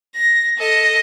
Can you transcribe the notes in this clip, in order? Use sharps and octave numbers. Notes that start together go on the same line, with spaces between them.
A#6
A4 D#5